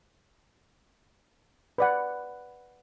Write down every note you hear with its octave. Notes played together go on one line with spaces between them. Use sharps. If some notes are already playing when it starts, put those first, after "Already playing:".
B4 D5 F#5